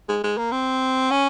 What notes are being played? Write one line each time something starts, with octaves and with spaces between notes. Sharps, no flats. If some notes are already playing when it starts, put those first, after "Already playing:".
G#3
G#3
A#3
C4
C#4